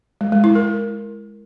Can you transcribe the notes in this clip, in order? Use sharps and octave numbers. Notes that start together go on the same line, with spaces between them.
G#3
G#3
E4
A#4